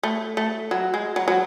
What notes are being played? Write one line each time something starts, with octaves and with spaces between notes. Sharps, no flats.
A3
A3
F#3
G#3
F#3
F#3